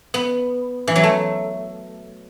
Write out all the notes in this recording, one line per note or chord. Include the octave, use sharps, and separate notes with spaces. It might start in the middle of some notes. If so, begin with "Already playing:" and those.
B3
E3
F#3
A3